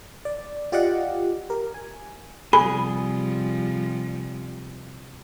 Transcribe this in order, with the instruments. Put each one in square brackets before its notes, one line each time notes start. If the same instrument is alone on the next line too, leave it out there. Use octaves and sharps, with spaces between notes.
[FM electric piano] D5
F4 G4 D5 D#5 F5 F#5
G4 A#4
G#5
[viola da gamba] C3 F3 G3 [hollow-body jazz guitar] G#4 [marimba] B5